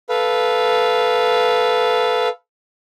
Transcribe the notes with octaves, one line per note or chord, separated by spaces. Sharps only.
A4 B4 F5